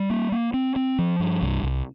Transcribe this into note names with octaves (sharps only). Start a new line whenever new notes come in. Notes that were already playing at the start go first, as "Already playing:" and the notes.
Already playing: G3
A#3
A#3
C4
C4
F3
G2
C2
C2